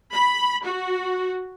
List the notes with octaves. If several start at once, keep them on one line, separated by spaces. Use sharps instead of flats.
B5
F#4